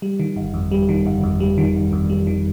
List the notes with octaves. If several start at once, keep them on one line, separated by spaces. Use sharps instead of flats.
G3
D#3
G1
F2
G3
D#3
G1
F2
G3
D#3
G1
F2
G3
D#3